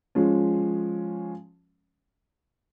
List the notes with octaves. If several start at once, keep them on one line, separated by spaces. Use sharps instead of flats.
F3 G#3 C#4